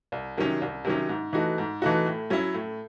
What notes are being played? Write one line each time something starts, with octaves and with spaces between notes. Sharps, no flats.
C2
C3 D#3 F#3 C#4
C2
C3 D#3 F#3 C#4
G#2
E3 A3 D#4 F#4
G#2
E3 A3 D#4 F#4
A2
F#3 C#4 E4
A2